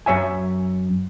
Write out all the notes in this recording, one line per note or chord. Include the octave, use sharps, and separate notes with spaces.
F#2 C#5 E5 G#5